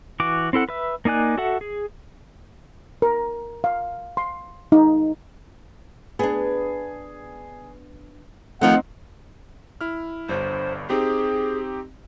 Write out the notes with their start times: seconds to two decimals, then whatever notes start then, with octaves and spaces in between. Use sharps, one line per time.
0.20 E3 F#4 D6
0.53 C4 E4 A4 F#5
0.69 B4 E5
1.05 A#3 D#4 D5 G#5 F#6
1.37 F#4 A4 E5 F#5
1.61 G#4
3.02 A#4
3.64 F5
4.17 C6
4.72 D#4
6.19 B3 D4 G#4
8.61 D#3 F3 A3 C4 D#4 F#5
9.81 E4 F6
10.29 G1 G2 C5
10.90 C4 D#4 G4 G#4